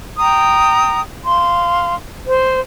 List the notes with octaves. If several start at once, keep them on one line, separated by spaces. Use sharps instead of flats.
G5 A#5 D#6
F5 C6
C5